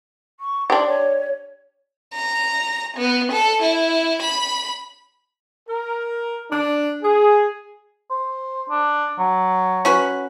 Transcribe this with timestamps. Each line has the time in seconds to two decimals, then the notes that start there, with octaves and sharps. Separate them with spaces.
0.40 C#6
0.70 D4 G4 C6
0.87 C#5
2.14 A#5
2.97 B3
3.32 A4
3.62 E4
4.22 B5
5.69 A#4
6.51 D4
7.03 G#4
8.10 C5
8.70 D4
9.19 F#3
9.85 C#4 F#4 B4